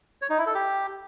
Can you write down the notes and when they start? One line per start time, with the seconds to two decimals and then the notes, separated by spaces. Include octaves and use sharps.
0.21 C#5
0.30 D#4
0.38 E4
0.46 A4
0.55 G4